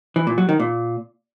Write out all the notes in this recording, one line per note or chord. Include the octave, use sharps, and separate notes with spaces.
E3
A#2
F#3
D#3
A#2